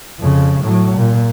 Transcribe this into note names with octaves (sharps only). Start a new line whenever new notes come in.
F2 C#3
A2 F#3
A#2